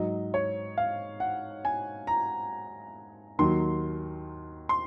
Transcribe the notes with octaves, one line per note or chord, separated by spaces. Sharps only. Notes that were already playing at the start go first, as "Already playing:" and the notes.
Already playing: G#2 F#3 D#5
C#5
F5
F#5
G#5
A#5
D#2 D#3 F#3 C6
C6